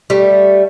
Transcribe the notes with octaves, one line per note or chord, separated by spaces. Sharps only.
G3 A3